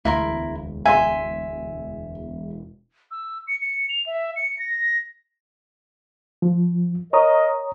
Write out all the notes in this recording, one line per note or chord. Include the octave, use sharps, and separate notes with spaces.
E1 D2 E4 A#4 C6
E5 G#5 C6
E6
C#7
C#7
F7
E5
C#7
A#6
F3
A#4 C#5 D#5 A#5 D#6